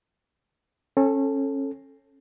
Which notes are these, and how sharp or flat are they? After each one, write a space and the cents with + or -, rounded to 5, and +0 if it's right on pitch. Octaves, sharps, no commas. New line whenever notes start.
C#4 -25 A4 +0